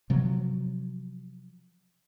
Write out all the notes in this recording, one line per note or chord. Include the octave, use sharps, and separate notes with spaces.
C3 F3 F#3